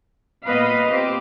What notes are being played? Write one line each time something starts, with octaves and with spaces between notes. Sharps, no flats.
A#2 B3 B4 D#5 F5
C4 G4